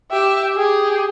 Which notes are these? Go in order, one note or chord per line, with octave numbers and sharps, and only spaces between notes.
G4 E5
G4 G#4